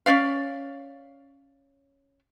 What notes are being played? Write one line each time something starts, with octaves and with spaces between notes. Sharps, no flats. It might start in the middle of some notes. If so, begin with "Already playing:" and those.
C#4 D#4 D5 F5